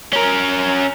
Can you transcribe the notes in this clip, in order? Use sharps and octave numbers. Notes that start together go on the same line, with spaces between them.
C#4 A#4